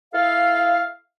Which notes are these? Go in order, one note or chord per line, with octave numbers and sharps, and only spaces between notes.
E4 A4 F5